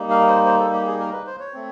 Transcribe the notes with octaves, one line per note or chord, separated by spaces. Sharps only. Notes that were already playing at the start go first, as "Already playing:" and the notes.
Already playing: G3 A#3 D#4
F5
C5
C5
A4
G4
G#4
A#4
B4
C5
C#5
A3 C4